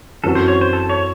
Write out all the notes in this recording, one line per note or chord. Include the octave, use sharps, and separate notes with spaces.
F#2 E3 C4 F#4 A4
C5
C#5
C5
A4
C#5